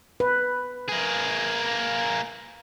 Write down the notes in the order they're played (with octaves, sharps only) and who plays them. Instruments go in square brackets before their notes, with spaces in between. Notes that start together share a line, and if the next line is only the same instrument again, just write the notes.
[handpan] B4
[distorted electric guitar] A#3 G#4